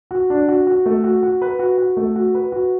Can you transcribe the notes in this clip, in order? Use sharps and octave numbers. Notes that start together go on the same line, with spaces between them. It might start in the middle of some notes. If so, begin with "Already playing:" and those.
F#4
D4
F#4
F#4
A3
F#4
F#4
B4
F#4
F#4
A3
F#4
B4
F#4